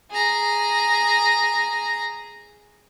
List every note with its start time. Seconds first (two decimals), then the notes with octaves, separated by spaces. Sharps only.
0.11 G#4 A#5